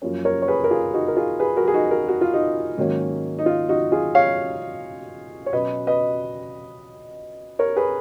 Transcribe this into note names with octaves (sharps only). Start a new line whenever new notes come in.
F#2 F3 A#3 C#4
A#4 C#5
C#5
G#4 B4
A#4
F4 G#4
D#4 F#4
A#4
F4 G#4
G#4 B4
F#4 A#4
G#4
D#4 F#4
F#4 A#4
F#4
F4
D#4 F#4
G#2 D#3 F#3 A#3 C#4
D#4
F4
D#4 F#4
F4 G#4
C#5 F5
C#5
B2 F#3 C#4 B4 D#5
B4 D#5
A#4 C#5
G#4 B4